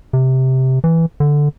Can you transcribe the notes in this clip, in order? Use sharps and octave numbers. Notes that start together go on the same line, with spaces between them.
C3
E3
D3